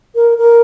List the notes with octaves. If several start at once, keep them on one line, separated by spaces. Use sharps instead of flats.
A#4
A#4